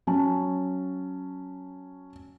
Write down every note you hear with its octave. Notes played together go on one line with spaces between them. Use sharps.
F#3 C#4 A5